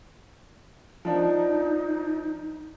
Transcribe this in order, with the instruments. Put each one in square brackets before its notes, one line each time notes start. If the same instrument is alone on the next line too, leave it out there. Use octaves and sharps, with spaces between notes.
[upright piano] F3 D4 [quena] D#4